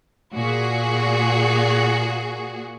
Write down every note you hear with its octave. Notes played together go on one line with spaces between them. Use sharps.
A#2 F#4 G#4